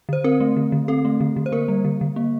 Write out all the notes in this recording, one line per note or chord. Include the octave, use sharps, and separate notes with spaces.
D3 C5
C4 A#4
A3
D3
D3
C4 A4
A3
D3
D3
C5
A#3 A#4
G3
D3
D3
A#3